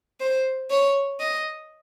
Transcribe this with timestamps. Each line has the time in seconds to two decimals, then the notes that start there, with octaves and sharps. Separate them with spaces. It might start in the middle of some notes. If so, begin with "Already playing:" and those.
0.21 C5
0.71 C#5
1.20 D#5